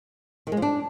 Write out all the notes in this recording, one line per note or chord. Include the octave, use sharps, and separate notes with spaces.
D#3
G#3
F3
D4